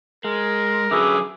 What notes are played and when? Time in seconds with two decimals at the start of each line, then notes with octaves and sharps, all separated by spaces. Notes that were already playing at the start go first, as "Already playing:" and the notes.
0.24 G#3 A#4
0.91 D3 F#3 C#4 G#4 B4 E5 D6